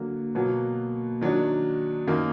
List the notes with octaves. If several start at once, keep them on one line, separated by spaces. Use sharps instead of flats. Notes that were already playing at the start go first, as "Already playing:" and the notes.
Already playing: D3 F#3 A#3
B2 F#3 A#3
D#3 F#3 D4
F#2 D#3 A#3